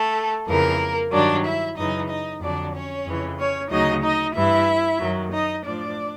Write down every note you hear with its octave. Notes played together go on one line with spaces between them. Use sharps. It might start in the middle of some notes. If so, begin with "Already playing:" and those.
Already playing: A3 A4
F2 C#3 E3 A#3 A#4
G2 D#3 F#3 D4 D5
E4 E5
F#2 C#3 E3 D#4 D#5
D#4 D#5
F2 D3 F#3 D4 D5
C#4 C#5
F2 C#3 E3
C#4 C#5
D2 C#3 F#3 D#4 D#5
D#4 D#5
G2 E3 E4 E5
F#2 D#3 F#3
D#4 D#5
A2 F3 D4 D5